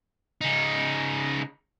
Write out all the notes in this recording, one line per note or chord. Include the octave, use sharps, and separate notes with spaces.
C#3 D#4